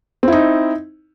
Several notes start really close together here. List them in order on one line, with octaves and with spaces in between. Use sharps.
C4 E4 D#4